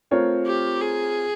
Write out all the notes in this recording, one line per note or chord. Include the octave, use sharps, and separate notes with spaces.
A3 C4 F4 A#4 C#5
G4
G#4